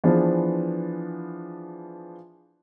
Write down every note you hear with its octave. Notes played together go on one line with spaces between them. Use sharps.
E3 F3 B3 D4 G#4